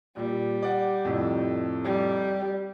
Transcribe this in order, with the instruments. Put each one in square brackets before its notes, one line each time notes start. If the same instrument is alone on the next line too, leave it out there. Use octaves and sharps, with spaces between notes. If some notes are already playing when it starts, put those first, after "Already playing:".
[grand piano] A#2 [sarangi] G3
[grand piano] D5 F#5
F2 A2 C3
[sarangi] G3